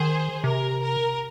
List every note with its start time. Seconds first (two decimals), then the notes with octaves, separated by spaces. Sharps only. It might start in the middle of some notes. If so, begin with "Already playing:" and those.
Already playing: D#3 G#4 C5
0.44 C3 A#4
0.82 A#4